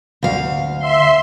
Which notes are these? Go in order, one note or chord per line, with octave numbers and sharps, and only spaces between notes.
D2 F5
E5 C6